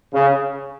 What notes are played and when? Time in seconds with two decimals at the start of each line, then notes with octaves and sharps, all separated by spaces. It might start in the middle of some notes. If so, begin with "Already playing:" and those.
0.14 C#3